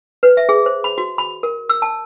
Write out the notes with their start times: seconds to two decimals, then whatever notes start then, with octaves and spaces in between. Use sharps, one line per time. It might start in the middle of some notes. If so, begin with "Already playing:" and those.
0.23 B4
0.37 E5
0.49 G#4
0.66 C5
0.84 B5
0.98 F#4
1.18 B5
1.43 A#4
1.70 E6
1.82 A5